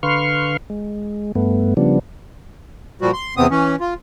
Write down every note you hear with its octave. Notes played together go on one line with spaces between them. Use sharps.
D3 B4 F5 C6 C#6 F6
G#3
G2 A3 B3
C#3 F3 G3 B3 D4
A#2 F3 G3 F#4
C6
E2 C3 B3 C4 D#6
E3 C#4
F4